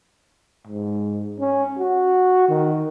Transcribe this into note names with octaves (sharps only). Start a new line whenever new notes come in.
G#2
C#4
F#4
D#3